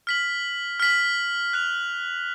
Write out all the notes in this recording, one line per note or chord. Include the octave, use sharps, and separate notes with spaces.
F6 B6 F#7
F6 B6 F#7
F#6 B6 F7